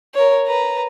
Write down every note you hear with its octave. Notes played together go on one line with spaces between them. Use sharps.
A#4 C#5
B4 A#5